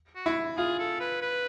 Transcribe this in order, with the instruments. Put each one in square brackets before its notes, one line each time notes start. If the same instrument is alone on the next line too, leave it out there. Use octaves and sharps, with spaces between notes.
[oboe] F#4
[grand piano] E4
[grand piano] F4 [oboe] G#4
[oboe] A4
B4
B4